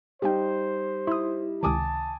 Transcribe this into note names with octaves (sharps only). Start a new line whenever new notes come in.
G3 D#4 G4 C5 F5 G5
E4 C6 D#6
C#2 C3 D#3 G#5 A5 D6 D#6